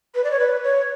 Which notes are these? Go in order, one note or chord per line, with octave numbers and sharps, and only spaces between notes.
B4
D5
C#5
B4
C#5